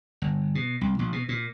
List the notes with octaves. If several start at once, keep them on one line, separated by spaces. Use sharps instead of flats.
G1
B2
C2
A#1
B2
A#2